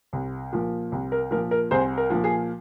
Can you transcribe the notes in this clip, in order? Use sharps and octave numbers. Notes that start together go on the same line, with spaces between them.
C2
A#2 F3
C2
A#4
A#2 F3 A#4
A#4
C2 G#4 C5
A#4
A#2 F3
G#4